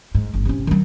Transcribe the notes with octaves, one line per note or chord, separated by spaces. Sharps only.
G#2
G1
C3 C#4
D#3 F#3